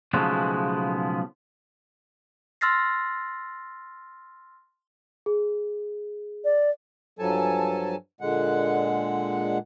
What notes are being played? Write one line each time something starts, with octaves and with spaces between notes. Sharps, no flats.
B1 C#3 F3 G#3 A3 B3
C6 E6 F6 A6 A#6 C7
G#4
D5
G2 F3 F#3 A4 G#5 A5
A#2 D3 G#3 F#5